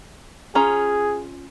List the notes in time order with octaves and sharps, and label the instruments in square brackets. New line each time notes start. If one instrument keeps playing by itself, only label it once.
[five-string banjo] C#4 F4 A#5 [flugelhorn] G#4